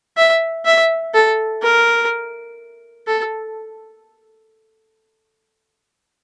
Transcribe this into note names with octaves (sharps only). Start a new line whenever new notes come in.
E5
E5
A4
A#4
A4